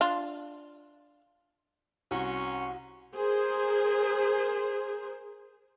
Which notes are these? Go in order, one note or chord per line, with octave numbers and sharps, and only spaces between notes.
D4 F4
C2 C#4 F#4 C6 C#6
G#4 A#4 C5